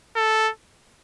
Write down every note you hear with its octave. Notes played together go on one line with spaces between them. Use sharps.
A4